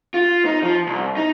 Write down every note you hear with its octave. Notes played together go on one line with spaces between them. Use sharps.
F4
D#4
F3
C2
D#4